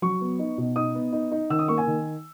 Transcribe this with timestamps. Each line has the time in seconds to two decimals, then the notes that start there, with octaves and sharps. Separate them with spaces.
0.02 F#3 C#6
0.21 B3
0.39 D#4
0.58 B2
0.76 D#4 D#6
0.95 B3
1.13 D#4
1.32 D#4
1.50 D#3 E6
1.59 D#6
1.68 A#3 C#6
1.78 G#5
1.87 D#3